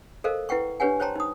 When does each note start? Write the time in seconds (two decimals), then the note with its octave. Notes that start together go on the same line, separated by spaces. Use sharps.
0.24 A4 A#4 C5 D#5 F5
0.49 E4 B4 F#5 G5 C#6
0.80 D4 G4 B4 C#5 F#5 G#5
1.00 C5 C#5 G5 A5 A#5 C6
1.16 D#4 D#6